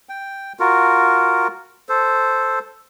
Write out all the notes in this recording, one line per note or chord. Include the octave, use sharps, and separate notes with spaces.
G5
F4 F#4 A#4
A4 C5